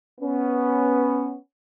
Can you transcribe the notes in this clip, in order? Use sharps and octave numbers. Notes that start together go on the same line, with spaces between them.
B3 C#4